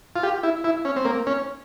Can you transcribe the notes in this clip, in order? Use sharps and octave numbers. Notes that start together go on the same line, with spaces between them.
F4
G4
E4
E4
C#4
C4
A#3
C#4